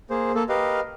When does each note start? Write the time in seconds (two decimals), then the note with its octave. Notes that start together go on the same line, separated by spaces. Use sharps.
0.10 A#3 G#4 C5
0.35 A#3 A4
0.49 G4 A#4 B4 D#5 F5